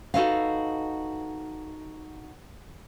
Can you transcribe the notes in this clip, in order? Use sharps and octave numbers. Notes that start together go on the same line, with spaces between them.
D#4 F#4 A4 B4 D#5 F5